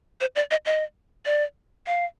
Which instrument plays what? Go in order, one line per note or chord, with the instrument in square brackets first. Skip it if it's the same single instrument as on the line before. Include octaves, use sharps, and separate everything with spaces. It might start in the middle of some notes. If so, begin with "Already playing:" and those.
[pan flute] C5
D5
D#5
D#5
D5
F5